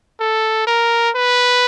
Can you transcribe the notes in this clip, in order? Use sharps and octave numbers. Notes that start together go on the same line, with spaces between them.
A4
A#4
B4